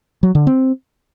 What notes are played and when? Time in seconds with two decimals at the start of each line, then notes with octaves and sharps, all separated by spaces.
0.23 F#3
0.35 D3
0.47 C4